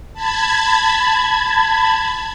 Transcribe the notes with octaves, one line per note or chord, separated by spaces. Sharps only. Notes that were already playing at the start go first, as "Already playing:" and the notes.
A5 B5 G#6